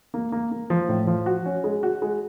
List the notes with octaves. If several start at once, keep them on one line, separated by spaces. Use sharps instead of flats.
A#3
A#3
A#3
F3
A2
F3
F#4
C#4
G#3
F#4
G#3